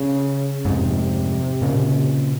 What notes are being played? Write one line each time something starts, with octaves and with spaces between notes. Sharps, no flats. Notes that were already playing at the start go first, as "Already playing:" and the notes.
Already playing: C#3
F2 G#2 C3
A#2 C#3